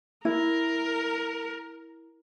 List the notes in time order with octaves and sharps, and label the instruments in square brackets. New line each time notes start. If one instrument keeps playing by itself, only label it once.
[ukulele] E4 [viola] A#4